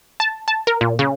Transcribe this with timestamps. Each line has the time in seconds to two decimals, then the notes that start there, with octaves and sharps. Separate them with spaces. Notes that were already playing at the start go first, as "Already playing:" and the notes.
0.20 A5
0.48 A5
0.67 A#4
0.81 A#2
0.99 C#3